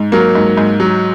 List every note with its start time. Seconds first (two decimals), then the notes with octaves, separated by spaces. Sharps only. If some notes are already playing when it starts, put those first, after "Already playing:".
Already playing: G#2
0.12 F#3 A#3
0.35 G#2
0.57 G#2
0.80 F#3